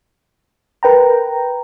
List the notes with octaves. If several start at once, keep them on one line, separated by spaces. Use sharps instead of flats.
A#4 B4 G5 A#5